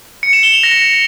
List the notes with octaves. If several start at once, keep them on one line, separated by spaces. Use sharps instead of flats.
C#7
E7
G7
F7
A#6